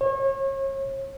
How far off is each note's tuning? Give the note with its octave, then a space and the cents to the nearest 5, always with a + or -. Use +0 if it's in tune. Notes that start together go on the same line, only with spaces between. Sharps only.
C#5 -35